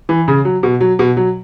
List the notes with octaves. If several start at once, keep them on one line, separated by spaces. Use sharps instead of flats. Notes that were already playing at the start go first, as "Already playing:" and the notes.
E3
C#3
F#3
B2
F#3
B2
F#3